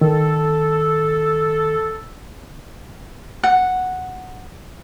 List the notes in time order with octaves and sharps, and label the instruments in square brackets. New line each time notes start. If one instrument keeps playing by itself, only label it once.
[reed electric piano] D#3 [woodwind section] A4
[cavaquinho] F#5